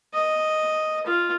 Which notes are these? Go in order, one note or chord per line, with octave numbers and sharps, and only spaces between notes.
D#5
F4